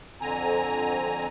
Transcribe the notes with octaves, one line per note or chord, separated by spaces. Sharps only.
F2 D3 C4 G#5 A#5